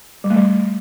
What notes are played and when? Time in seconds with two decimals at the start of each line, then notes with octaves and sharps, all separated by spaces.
0.24 G3
0.30 A3
0.37 G3